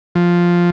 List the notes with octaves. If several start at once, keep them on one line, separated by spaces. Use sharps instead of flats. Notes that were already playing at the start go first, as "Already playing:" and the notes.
F3